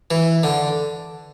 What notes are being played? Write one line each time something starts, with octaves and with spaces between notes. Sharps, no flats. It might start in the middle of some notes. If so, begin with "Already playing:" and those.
E3
D3